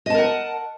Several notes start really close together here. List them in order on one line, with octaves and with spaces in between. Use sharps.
D#5 A5 A#4 F#5